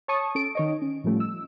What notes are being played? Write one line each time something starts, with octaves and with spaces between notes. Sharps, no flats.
C#5 A5 C#6 D#6
C#4 A4 D7
D#3 C#5 D#5
C#4
A2 F3 G3 A3 C#4
E6